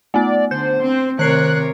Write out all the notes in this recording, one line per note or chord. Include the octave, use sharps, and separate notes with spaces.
A3 B3 D5
D3 C5 G6
C4
C3 D#3 A#4 C#5 F#6 C7